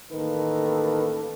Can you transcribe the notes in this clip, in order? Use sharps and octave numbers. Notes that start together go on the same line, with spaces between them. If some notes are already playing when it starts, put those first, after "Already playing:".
A1 D#3 A#3 A4 B4